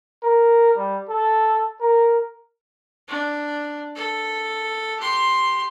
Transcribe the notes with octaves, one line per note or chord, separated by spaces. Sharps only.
A#4
G3
A4
A#4
D4
A4
G4 C6